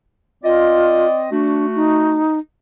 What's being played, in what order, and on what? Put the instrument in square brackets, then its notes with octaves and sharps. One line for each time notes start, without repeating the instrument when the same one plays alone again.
[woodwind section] C4 D5 D#5 [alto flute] F4
[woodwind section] A3 F#4 [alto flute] D4
[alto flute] D#4